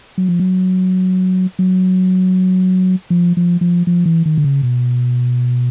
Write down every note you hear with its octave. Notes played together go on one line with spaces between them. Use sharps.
F#3
F3
F#3
F#3
F3
F3
F3
F3
E3
D#3
D3
C#3
B2